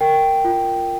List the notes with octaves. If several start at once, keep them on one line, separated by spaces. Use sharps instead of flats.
A#4 G5
F4